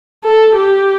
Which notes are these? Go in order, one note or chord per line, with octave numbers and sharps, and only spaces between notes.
A4
G4